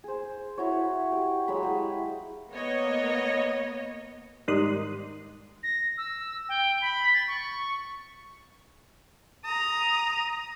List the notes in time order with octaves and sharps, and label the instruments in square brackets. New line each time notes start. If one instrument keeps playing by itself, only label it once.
[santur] G#4 C5
E4 F#4 C#5
G4
F#3 G#3 F5 B5
G#3 E4 G4
[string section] A#3 B3 C#5 D#5
[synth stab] G#2 D#3 G3 C6 D#6 F#6
[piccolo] A#6
E6
G5
B5
A6
C#6
[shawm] A#5 [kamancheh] D#6